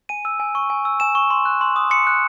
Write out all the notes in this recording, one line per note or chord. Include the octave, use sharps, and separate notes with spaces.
G#5 D#7
E6
G#5
C#6
G#5
E6
G#5 E7
C#6
C6
F#6
C6
D#6
C6 C#7
F#6